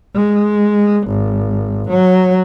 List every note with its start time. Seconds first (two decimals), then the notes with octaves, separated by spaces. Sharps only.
0.15 G#3
1.08 G#1
1.89 F#3